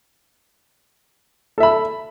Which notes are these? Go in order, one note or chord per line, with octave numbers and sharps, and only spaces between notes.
A4 E5 B5